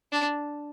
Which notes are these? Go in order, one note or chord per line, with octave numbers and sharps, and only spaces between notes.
D4